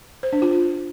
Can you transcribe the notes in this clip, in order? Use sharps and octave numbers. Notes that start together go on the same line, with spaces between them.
C5
D4
F4